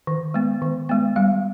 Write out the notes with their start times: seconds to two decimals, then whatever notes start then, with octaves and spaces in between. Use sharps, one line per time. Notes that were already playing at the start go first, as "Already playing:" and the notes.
0.07 D#3
0.34 G#3 B3
0.62 D#3
0.89 G#3 B3
1.16 G3 F5